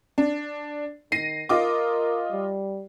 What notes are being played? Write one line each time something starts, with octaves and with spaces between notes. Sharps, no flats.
D4
D#3 A#6 C7 D#7
F4 A#4 D#5 D6
G3